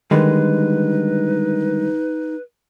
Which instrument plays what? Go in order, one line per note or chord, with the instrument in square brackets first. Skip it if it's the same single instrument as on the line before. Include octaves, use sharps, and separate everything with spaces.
[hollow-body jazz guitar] D3 G3 G#3 [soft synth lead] D#3 [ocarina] D#4 [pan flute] B4